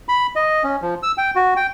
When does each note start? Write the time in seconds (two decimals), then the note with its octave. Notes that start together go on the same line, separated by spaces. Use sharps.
0.09 B5
0.36 D#5
0.64 C#4
0.82 F3
1.03 E6
1.18 G5
1.36 F#4
1.56 G5